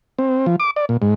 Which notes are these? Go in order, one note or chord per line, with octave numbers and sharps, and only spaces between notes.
C4
F3
D6
D5
A#2
G#2